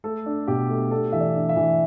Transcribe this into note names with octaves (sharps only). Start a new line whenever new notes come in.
A3 A4
D4
B2 G4
A3
D4 A4
E3 E5
D5
D4
E5
E3